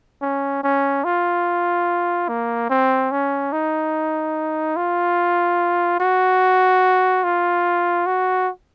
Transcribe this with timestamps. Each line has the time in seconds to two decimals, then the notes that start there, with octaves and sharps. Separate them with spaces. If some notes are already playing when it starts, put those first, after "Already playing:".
0.22 C#4
0.63 C#4
1.05 F4
2.29 A#3
2.70 C4
3.11 C#4
3.52 D#4
4.76 F4
6.00 F#4
7.24 F4
8.06 F#4